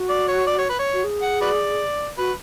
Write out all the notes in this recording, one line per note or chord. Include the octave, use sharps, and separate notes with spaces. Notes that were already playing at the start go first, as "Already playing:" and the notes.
Already playing: F#4
D5
C#5
D5
C#5
B4
C#5
F#4
G#4
F#5
F#4 B4 D5
F#4 B4